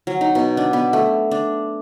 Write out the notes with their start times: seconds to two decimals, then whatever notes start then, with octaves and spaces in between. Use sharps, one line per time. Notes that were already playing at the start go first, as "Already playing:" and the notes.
0.07 F#3
0.21 D#4
0.35 B2
0.57 D4
0.73 B3
0.93 A3
1.31 D4